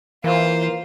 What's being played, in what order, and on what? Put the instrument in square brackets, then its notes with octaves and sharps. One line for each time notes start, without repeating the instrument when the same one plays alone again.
[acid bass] E3 [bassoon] A#3 [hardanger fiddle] F4 C5